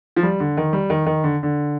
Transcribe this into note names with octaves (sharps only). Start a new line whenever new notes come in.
F3
G3
D3
D#3
G3
D#3
D#3
D3
D3